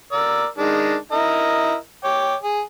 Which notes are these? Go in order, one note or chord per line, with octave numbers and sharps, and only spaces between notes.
A#4 D5 E6
D#3 G#3 D4
E4 A#4 D#5
C#5 G5 D6
G#4